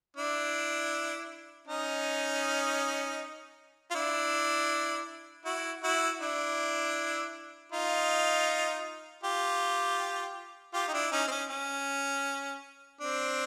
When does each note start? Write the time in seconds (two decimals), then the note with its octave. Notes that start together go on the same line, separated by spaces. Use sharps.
0.17 D4 E4
1.68 C#4 D#4
3.91 F4
3.95 D4 E4
5.45 E4 F#4
5.83 E4 F#4
6.21 D4 E4
7.72 D#4 F4
9.23 F4 G4
10.74 F4 G4
10.88 D#4
10.93 D4 E4
11.12 C#4 D#4
11.27 C4
11.31 C#4
11.50 C#4
13.01 C4 D4